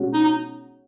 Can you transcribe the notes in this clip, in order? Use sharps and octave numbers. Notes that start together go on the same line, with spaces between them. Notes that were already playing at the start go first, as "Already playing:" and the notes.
Already playing: B2 G#3 C#4 F#4
D#4
D#4